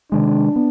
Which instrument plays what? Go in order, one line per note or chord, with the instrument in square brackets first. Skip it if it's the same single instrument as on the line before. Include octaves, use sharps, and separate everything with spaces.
[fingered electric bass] C3 D#3 G#3 [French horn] D4
[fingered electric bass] B3